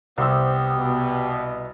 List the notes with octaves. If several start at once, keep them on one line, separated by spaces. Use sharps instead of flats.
C2 B3 G4 C5 E6
B2